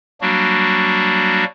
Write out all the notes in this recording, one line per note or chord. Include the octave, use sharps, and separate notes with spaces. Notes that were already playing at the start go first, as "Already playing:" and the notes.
F#3 G3 A#3 D4 F#4